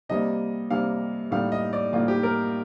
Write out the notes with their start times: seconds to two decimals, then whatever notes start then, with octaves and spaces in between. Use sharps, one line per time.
0.09 C3 G3 A#3 D#5
0.70 C3 G3 A#3 F5
1.31 A2 G3 A#3 F5
1.52 D#5
1.73 D5
1.93 A2 G3 A#3 F4
2.08 G4
2.23 A#4